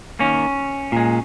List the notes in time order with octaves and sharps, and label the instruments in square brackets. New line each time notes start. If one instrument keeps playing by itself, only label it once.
[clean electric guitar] D#3 A#3 C#4
A#2 G#3